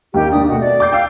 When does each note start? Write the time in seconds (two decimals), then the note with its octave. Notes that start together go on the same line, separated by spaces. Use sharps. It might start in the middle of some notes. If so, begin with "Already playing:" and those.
0.14 D#2 D#3 G4
0.32 D#2 D4 D#6
0.49 B2 A3 F#4
0.60 D5
0.80 D6 G6 C7
0.92 F5 G5 E6